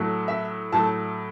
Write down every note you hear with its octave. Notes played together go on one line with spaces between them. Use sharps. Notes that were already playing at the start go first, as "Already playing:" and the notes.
Already playing: A2 F#3 A3
E5
A2 F#3 A3 A5